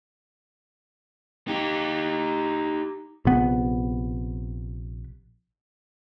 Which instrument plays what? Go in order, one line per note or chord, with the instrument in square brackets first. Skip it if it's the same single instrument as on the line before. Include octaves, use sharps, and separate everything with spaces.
[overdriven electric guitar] D#4 G4
[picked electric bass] A#1 C3 B3